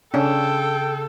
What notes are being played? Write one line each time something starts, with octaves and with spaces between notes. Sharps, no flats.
C#3 C#4 D4 A4 G5